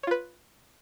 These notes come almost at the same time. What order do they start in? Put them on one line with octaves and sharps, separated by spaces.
C#5 F4 B4